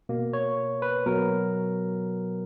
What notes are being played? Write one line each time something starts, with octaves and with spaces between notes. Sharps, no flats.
B2 A#3
C#5
B4
B2 F#3 B3 A#4